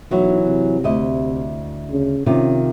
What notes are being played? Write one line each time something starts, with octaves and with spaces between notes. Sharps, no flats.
B1 E3 F#3 F#4
C3
D2 E4 D#5
C#3
C3 D#3 C#4 F4